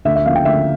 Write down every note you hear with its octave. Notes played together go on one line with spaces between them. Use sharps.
D2 E5
E5
C#3 F3 A#3 F5
G5
D2 E5